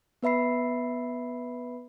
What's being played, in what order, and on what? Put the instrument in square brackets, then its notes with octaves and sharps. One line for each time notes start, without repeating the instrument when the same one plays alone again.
[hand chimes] B3 B4 E5 B5 C7